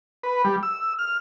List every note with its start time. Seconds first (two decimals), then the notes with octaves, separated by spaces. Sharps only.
0.23 B4
0.45 G3
0.63 E6
0.99 F6